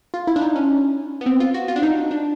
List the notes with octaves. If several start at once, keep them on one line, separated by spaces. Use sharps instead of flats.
F4
E4
D4
D#4
C#4
B3
C4
F4
F#4
F4
D4
D#4
D4